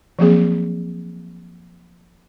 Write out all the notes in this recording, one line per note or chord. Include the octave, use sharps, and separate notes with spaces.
F3 F#3 A#3 C4 G#4